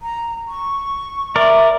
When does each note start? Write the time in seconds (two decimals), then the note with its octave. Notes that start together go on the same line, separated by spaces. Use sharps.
0.02 A#5
0.48 C#6
1.36 A#4 D5 E5